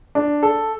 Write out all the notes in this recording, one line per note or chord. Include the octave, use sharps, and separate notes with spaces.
D4
A4